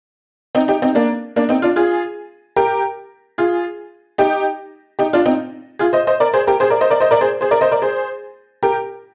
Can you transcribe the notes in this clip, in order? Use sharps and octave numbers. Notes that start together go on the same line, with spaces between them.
C4 D#4
D#4 G4
C4 D#4
A#3 D4
A#3 D4
C4 D#4
D4 F4
F4 G#4
G4 A#4
F4 G#4
D#4 G4
D#4 G4
D4 F4
C4 D#4
F4 G#4
C5 D#5
C5 D#5
A#4 D5
G#4 C5
G4 A#4
G#4 C5
A#4 D5
C5 D#5
A#4 D5
C5 D#5
A#4 D5
G#4 C5
G#4 C5
A#4 D5
C5 D#5
A#4 D5
G#4 C5
G4 A#4